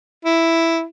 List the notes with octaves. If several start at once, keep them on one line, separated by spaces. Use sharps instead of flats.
E4